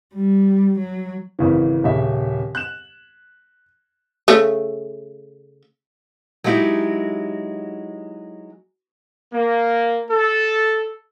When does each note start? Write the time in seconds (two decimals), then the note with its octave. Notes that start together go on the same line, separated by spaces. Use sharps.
0.15 G3
0.79 F#3
1.39 G#1 C#3 E3
1.84 D#1 C#3 E5
2.55 F#6 E7
4.28 C#3 A3
6.44 F#3 G#3 D#4 E4 G4
9.32 A#3
10.10 A4